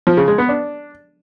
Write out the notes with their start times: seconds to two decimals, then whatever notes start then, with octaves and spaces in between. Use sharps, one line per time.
0.07 F3
0.17 C#3
0.28 G#3
0.38 B3
0.49 D4